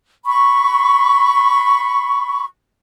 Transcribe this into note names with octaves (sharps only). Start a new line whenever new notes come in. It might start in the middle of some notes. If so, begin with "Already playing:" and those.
B5 C#6